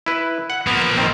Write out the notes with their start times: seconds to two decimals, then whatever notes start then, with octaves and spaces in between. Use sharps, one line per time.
0.06 E4 B4
0.50 F#5
0.67 F3 A#3 B3
0.98 D#3 C4